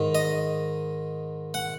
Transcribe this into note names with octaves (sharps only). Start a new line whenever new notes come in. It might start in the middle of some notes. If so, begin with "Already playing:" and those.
Already playing: G#2 D#3
D#5
F#5